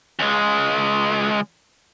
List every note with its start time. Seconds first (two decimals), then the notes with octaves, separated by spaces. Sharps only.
0.19 C#2 G#3